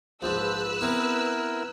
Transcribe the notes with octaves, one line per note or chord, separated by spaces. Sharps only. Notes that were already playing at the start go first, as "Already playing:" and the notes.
A#1 G#2 F3 B4 C5 E6 F#6
B3 C4 E4 A#4